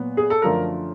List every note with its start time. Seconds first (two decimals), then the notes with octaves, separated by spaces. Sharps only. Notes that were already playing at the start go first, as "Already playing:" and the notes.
Already playing: A#2 F#3 B3
0.17 G#4
0.30 A4
0.42 F#2 D3 F3 A3 A#4